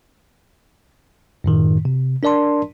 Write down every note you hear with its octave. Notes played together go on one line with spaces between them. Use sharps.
F#2 A2 D#3
C3
D4 A#4 D5 A5 C6